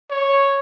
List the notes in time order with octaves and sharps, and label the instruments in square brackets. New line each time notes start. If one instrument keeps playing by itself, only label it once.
[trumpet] C#5